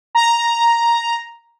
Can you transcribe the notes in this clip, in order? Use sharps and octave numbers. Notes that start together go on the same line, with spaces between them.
A#5